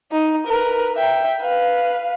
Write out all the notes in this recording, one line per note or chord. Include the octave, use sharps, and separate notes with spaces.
D#4
A#4 B4
E5 G5
B4 F5